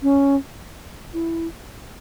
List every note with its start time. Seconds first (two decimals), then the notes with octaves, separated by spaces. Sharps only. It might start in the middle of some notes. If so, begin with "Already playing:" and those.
0.02 C#4
1.13 E4